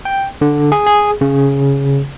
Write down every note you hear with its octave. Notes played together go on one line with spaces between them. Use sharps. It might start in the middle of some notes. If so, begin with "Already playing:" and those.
G5
D3
G#4
G#4
C#3